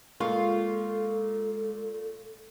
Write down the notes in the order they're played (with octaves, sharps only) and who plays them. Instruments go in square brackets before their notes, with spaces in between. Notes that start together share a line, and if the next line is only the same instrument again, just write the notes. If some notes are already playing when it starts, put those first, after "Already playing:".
[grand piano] A#2 C#6 [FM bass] G#3 [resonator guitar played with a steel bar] F4 [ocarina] A4